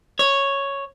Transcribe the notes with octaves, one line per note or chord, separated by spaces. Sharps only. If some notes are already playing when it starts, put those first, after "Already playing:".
C#5